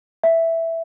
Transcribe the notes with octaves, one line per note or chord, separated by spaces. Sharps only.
E5